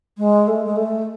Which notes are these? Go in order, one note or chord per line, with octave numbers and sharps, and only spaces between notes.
G#3
A3
G#3
A3